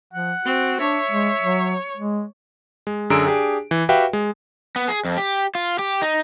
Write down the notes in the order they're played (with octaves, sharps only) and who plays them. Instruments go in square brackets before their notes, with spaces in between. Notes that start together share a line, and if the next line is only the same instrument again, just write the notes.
[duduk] F3 [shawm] F#5
[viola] C4 [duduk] F#4
[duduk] D4 [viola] C#5 [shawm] E5
[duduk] G#3
F#3
G#3
[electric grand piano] G#3
F#2 D3 G#4 A#5 E6 D7
D4 G4 G#4
E3
F#4 G4 B4 E5 F5 G5
G#3
[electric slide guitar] B3
G#4
F2
G4
F4
G4
D#4